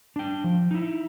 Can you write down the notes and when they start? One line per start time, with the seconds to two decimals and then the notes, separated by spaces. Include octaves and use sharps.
0.16 D4 G5
0.44 F3
0.71 D#4 E4